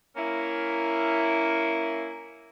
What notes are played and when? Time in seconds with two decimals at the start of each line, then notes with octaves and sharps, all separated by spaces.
0.16 A#3 C#4 E4